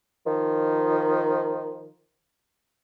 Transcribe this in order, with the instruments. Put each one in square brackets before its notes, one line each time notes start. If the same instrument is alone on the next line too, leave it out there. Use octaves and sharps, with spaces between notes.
[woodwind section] D#3 F3